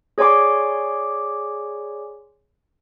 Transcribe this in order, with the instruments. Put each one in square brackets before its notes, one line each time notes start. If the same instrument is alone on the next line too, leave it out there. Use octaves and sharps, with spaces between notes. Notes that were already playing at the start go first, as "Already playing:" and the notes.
[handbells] G#4 C#5 D5 G#5 C6 D6